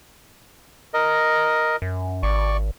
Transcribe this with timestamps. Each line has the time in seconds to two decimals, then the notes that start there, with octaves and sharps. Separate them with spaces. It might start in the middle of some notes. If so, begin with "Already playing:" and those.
0.94 A#4 D#5
1.82 F#2
2.23 G#1 D5 C#6